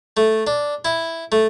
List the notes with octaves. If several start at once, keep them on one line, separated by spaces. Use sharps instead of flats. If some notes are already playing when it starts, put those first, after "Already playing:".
A3
D4
E4
A3